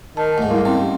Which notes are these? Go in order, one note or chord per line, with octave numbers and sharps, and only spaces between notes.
D#3 A5
D2 G#2
G3 A#3 E4
D#3 C4 C#4 E4
G4